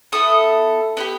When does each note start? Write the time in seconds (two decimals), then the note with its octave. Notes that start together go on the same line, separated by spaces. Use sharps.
0.12 B3 E4 A4 D#6
0.97 B3 E4 G4